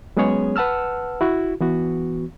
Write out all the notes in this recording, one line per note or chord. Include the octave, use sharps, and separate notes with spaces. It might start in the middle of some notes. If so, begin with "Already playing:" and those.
F#3 G#3 B3 C#4 G#4 C#5
B4 F#5 A5 E6 F6
E4 F#4
E3 B3 F#4